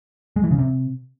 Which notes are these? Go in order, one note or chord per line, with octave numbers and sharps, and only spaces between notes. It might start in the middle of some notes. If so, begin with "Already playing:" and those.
G#3
E3
C#3
C3